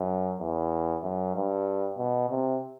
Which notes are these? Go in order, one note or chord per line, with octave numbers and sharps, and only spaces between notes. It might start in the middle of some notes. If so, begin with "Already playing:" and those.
Already playing: F#2
E2
F#2
G2
B2
C3